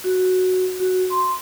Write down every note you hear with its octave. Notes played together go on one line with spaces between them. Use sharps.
F#4
F#4
C6